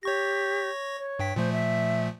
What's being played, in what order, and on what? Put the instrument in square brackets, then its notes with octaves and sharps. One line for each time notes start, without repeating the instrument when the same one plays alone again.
[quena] G4 [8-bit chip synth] C#5 C#6 A#6
[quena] C#5
[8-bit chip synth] G2 G5 B6
[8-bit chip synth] A#2 F3 A3 [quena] C5
[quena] E5